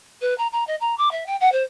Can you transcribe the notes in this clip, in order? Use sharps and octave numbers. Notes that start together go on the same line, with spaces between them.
B4
A#5
A#5
D#5
A#5
D6
E5
G5
F#5
C5